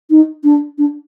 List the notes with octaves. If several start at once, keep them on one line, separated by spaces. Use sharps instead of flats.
D#4
D4
D4